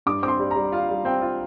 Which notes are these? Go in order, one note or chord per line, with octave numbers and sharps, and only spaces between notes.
G2 D6
C4 D6
C6
G3
G3 A#5
F4 F5
G3
C4 G5
F4